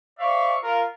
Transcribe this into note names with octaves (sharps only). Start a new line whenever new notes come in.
C5 D5 E5 F5 C#6
F4 A#4